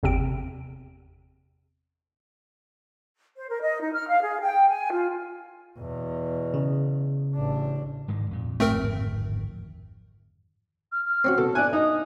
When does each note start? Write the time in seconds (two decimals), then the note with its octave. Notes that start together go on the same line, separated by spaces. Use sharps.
0.03 G1 E2 C3 C4 D7
3.36 C5
3.49 A#4
3.61 D#5
3.81 D#4
3.93 F6
4.08 F5
4.22 G#4
4.41 G5
4.68 G#5
4.92 F4
5.78 E2 B2
6.54 C#3
7.35 A1 D4
8.08 G#2 D#3 G#3
8.31 F2 A#2
8.60 D1 G#1 F2 A3 C4 A#4
10.92 F6
11.06 F6
11.24 C4 C#4 F#4
11.38 B2 A4
11.55 D5 G#5 F#6
11.73 D#4 D#6